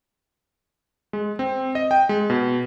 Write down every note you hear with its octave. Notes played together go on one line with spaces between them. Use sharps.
G#3
C4
D#5
G5
G#3
B2